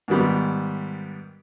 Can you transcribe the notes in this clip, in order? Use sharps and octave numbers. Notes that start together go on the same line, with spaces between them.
G#2 D#3 G3 B3